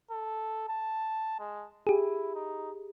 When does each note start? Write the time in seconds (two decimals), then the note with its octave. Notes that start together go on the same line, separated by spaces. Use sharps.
0.11 A4
0.69 A5
1.39 G#3
1.87 E4 G4 G#4
2.35 D#4